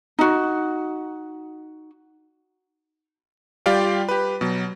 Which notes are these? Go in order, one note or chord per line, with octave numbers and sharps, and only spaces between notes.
D#4 F#4
G3 F4 G4 D5 F5 G5
G4 B4
B2 F#3